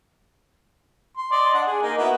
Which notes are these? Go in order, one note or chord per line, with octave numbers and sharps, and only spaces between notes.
C6
D5 D#5 C6
D4 F#5
G#4
A#3 D#4 A#4
B3 E4 F#4